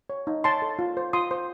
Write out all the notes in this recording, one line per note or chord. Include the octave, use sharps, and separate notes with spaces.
C#5
D#4
C#5 A5 C6
A4
F4
C5
F4 C6 D#6
C5